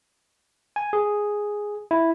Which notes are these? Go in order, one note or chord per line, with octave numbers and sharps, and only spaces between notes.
G#5
G#4
E4